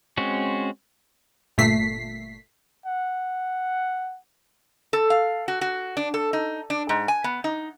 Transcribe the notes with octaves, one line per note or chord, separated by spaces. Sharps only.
G#3 C4 C#4 F#4
G1 A#2 A3 B6 C7
F#5
A4
F5
F#4
F#4
D4
A4
D#4
D4
G#2
G#5
B3
D#4